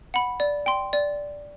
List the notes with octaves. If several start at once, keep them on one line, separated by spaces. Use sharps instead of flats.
F#5 B5
D5
G5 C6
D5